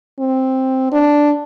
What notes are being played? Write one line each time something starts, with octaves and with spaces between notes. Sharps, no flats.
C4
D4